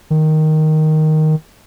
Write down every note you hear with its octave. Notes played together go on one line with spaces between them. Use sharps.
D#3